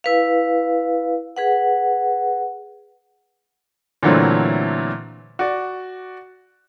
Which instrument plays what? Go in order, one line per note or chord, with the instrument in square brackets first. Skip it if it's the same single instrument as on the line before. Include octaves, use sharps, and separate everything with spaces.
[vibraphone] E4 B4 F5
G#4 B4 F#5
[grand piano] A#2 D3 E3 F#3 A3 C4
F#4 D5